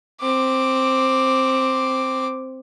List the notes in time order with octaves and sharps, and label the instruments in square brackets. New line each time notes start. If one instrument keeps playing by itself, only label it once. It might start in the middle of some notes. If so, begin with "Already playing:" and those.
[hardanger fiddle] C4 D6